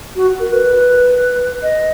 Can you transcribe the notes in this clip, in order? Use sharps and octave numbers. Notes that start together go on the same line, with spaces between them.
F#4
A#4
B4
D#5